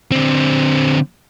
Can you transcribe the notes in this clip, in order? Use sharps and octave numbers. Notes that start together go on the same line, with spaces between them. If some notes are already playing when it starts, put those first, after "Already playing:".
D3 C4